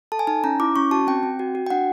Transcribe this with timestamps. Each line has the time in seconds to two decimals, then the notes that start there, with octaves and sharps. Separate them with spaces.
0.12 A4 A5
0.19 G#5
0.27 D#4 A5
0.44 C#4 A#5
0.60 E4 D6
0.76 C#4 C#6
0.91 F#4 A5
1.07 C4 G5
1.23 C4
1.39 F#4
1.55 F#4
1.67 G5
1.70 D4 F#5